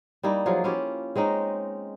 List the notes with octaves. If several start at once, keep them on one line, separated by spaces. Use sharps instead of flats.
G3 A#3 D#4 E4
F3 F#3 F4 G#4
C#4 E4 F4 G4
G#3 C4 C#4 D#4